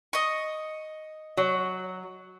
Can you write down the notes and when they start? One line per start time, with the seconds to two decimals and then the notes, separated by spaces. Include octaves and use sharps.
0.13 D#5 C#6
1.37 F#3